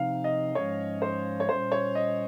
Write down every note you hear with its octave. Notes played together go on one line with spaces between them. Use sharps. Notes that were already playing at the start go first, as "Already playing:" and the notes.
Already playing: C3 F3 C4 D#4 F5
D#5
G#2 F3 G#3 C#4 C#5
C5
C#5
A#2 G3 C#4 C5
C#5
D#5